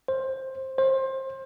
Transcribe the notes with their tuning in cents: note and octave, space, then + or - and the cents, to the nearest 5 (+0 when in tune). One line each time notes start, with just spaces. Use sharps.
C5 +15
C5 +25